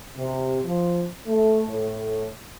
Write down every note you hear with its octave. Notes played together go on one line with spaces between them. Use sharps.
C3
F3
A3
A2